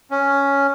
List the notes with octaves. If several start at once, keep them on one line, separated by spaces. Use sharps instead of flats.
C#4